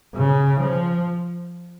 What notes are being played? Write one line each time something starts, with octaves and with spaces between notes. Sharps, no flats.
C#3
F3